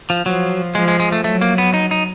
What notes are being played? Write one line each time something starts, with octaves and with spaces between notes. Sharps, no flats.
F3
F3 F#3
F3 G#3
G#3
G#3
A3
F#3 A3
A#3
B3
D#4
D#4